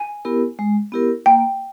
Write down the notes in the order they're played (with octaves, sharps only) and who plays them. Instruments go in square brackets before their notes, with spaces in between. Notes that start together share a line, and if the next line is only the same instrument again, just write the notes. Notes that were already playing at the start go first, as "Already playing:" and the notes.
Already playing: [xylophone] G#5
[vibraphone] B3 E4 G4 A#4
G#3
B3 E4 G4 A#4
[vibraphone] A#3 [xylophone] G5